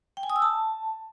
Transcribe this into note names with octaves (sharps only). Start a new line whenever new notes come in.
G5
G#5
D#6
E6
A5